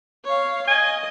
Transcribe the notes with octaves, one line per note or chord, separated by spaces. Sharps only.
C#5 F5
D#5 G#5